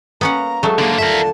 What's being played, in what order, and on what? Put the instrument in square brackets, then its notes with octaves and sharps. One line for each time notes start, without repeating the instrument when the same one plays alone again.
[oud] A#3 [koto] B3 C#4 F#5 [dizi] A#5
[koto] F#3 A3 [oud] G#3 A4
[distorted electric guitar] D3 A#3
[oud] D#2 D3 F4 [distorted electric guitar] A#4 E5 [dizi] A5